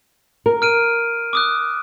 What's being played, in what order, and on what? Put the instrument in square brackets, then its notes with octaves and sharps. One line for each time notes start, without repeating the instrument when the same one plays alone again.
[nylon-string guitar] A#4
[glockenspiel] F6 D7 D#7
D6 D#6 F#6